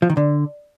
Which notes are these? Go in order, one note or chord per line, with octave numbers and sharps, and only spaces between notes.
F3
D#3
D3